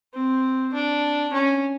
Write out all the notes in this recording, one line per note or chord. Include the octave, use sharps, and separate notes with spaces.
C4
D4
C#4